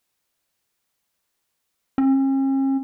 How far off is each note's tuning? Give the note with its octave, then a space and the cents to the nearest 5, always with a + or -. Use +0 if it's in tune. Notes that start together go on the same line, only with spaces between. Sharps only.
C#4 -45